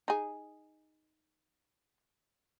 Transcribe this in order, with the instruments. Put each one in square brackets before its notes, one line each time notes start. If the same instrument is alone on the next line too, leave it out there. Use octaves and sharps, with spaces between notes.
[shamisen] D#4 G#4